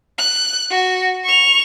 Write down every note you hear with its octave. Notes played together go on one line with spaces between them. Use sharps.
F#6
F#4
C#6 F7